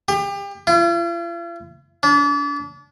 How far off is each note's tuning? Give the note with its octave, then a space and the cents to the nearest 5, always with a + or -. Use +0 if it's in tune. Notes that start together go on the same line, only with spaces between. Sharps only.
G4 +35
F4 -45
D4 -35